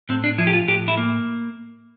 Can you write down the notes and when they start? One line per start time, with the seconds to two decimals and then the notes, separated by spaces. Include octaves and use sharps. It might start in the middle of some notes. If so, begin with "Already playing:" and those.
0.09 A2 C4
0.24 D4
0.38 F3 E4
0.47 G4
0.53 F4
0.68 A2 G4
0.88 E4
0.97 A#3